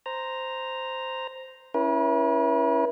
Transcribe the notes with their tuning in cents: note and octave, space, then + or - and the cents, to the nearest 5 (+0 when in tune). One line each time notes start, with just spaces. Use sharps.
C5 -5 A#5 +0
C#4 +0 E4 +0 B4 -45